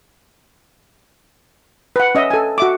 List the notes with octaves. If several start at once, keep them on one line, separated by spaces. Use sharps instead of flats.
B4 F#5
C#4 D#5 E5
A4 G#5
F#4 E5 D6